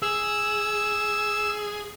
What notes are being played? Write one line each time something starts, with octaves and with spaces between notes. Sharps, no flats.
G#4 E6